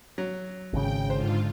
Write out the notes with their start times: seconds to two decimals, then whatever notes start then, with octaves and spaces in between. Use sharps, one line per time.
0.18 F#3
0.73 G#1 C#3 G5
1.10 G#2 D3 F4 C5